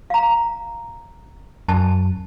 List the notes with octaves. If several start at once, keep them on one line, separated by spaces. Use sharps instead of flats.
F5 A#5
F#2 A5